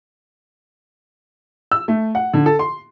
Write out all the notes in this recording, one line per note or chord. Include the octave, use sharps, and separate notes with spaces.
E6
A3
F#5
D3
A4
C6